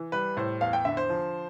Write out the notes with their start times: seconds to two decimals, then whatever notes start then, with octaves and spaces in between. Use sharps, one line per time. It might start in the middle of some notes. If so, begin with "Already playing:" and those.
Already playing: E3
0.12 G3 B4
0.37 A2 C5
0.61 E2 F5
0.73 G5
0.85 D3 E5
0.97 C5
1.09 F3